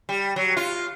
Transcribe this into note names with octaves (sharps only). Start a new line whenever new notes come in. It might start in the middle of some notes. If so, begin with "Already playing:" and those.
G3
F#3
F4